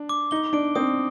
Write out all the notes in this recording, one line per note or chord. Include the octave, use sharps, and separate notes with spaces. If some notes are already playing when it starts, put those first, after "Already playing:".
Already playing: D4
D6
D#4 G7
D4 D7
C4 D#6